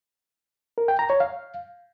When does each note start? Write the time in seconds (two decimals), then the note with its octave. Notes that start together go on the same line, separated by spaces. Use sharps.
0.78 A#4
0.88 G5
0.99 A#5
1.10 C#5
1.20 F5